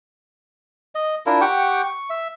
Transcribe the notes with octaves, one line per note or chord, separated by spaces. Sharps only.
D#5
D4 E4 F4 A#4
G4 F#5 G5 C#6
C#6
E5